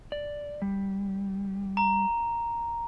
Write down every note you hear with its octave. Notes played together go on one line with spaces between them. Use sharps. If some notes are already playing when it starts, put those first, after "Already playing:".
D5
G3
A#5